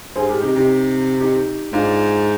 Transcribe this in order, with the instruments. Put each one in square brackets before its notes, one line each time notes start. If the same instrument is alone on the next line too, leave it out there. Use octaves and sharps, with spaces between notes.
[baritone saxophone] G2 [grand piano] G#4 C5
[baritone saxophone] G#2 [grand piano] G4 A#4
[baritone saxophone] C3 [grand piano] D#4 G4
[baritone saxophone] C3 [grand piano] D#4 G4
[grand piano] D#4 G4
[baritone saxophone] G#2 [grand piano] D4 F4